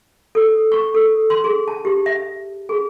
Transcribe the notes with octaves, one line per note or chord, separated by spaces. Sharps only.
A4
C#6
A4
C6
G#4
A5
G4
E5
G#4